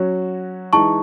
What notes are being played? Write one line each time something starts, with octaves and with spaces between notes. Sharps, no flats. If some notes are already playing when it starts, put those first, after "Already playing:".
Already playing: F#3 C#4 F#4
E3 G#3 D#4 A5 C#6